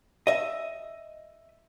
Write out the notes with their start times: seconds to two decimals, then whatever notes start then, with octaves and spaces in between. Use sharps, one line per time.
0.27 D#5 E5